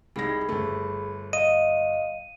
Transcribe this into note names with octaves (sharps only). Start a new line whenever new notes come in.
C2 D#4 G#4 B5 A#6
G1 A3
D#5 F5 D#7